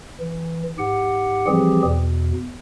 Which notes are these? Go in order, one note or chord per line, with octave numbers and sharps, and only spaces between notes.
E3
G#2 G4 F#5
E3 F3 G3 C4 G4 G#4
E2 B2